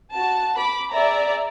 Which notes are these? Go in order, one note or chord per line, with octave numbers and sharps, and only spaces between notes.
F#4 A5
B5 D6
G#4 D5 E5 A#5